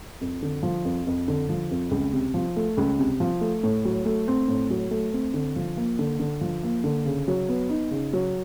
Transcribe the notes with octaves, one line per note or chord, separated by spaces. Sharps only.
F2
D3
F3
F2
F2
D3
F3
F2
C#2
C3
F3
A3
C#2
C3
F3
A3
A2
F#3
A3
C4
A2
F#3
A3
C4
D3
F3
A#3
D3
D3
F3
A#3
D3
C#3
F#3
B3
D#4
C#3
F#3